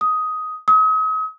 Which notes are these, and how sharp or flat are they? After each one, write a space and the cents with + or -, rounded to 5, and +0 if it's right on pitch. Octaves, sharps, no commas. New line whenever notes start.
D#6 +10
D#6 +40